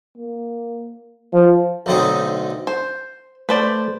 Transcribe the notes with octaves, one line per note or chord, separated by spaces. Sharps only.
A#3
F3
B1 A2 D3 C4 D#4
C5
A3 B4 C5 D5